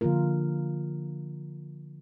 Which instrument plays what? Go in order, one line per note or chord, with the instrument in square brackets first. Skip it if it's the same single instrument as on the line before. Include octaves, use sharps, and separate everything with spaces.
[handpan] D3 F3 A#3 F4 A#4